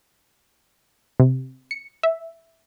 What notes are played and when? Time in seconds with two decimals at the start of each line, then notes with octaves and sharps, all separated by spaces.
1.20 C3
1.71 C#7
2.03 E5